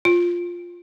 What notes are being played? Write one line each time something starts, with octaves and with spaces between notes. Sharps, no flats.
F4